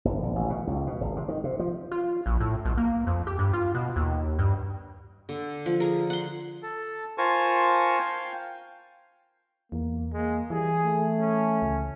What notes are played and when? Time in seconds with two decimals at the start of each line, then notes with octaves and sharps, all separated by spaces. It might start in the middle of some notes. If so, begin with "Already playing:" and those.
0.05 G1
0.23 A#1
0.36 A1
0.50 B2
0.67 C#2
0.87 B2
1.01 G#1
1.16 C3
1.28 D#3
1.44 C3
1.59 F3
1.92 F4
2.26 A#1
2.40 A2
2.65 B1
2.77 A#3
3.07 F2
3.27 G4
3.39 G2
3.53 F4
3.75 B2
3.96 D#2
4.39 G2
5.29 D3
5.66 F3
5.80 G#4 A#4
6.10 F#5 C6
6.63 A4
7.18 F4 A#4 C5 G#5 A5 C#6
8.00 F5 G5
9.72 E2 A#3
10.13 G#3 A#3
10.50 E3 G3 G#4
10.84 A3
11.18 C#4
11.62 C#2